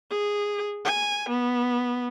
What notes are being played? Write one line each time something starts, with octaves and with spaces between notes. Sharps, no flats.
G#4
G#5
B3